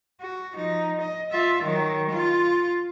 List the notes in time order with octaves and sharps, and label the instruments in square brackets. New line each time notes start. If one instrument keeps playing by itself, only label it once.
[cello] F#4
F3 D#4
D#5
F4 E5
D#3 F#3
F4